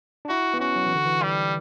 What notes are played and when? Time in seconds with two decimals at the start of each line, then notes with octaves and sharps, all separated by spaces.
0.25 D4
0.29 E4 F#4
0.54 B3
0.60 C#4 F#4
0.76 F#3
0.86 E3
0.95 D3
1.05 E3
1.23 G3